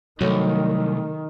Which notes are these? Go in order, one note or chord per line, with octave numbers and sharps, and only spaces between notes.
C2 D#3 F#3 A3 C#5